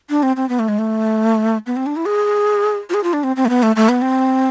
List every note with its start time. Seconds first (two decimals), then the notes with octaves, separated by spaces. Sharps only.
0.10 D4
0.23 C4
0.36 C4
0.49 B3
0.59 A3
0.68 G#3
0.79 A3
1.66 B3
1.76 C4
1.86 D4
1.96 E4
2.06 G#4
2.90 F4
2.94 G#4
3.04 F4
3.13 D4
3.24 C4
3.36 C4
3.45 A3
3.49 B3
3.63 A3
3.76 A3
3.89 B3
4.02 C4